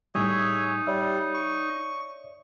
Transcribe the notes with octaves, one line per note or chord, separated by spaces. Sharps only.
A2 G3 D#4 G#4 C#5 E5
G3 C#5 D5 E5
C#6